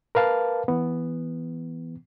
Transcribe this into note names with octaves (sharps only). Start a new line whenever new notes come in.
A#4 B4 F5 A5
E3 B3